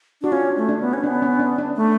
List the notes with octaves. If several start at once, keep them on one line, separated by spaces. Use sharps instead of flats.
D4 F#4
C#4 F4
A3
D4
B3
C#4
B3 D4
C#4
D4
D4
A3